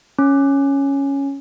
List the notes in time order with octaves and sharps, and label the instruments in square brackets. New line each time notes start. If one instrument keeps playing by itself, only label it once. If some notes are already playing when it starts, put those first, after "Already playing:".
[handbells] C#4